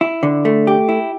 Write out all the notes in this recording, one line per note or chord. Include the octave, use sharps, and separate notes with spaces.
E4
D3
A3
G4
E4